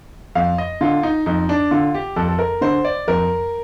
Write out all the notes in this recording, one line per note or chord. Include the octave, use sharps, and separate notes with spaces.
F2 F5
D#5
D3 F4
D#4
F2 D#4
D4
D3 F4
G4
F2 A4
A4
A#4
D3 C5
D5
F2 A#4